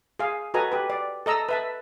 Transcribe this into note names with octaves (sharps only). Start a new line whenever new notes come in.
G#4 F5
F#4 A4 B4 D#5 G#5 A#5
G4 B4
D5
A4 D#5 A#5 E6
B4 E5 A5